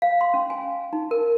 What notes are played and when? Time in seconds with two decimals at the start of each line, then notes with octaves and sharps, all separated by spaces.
0.02 F5
0.21 C6
0.34 C#4
0.50 G#5
0.93 D#4
1.11 A#4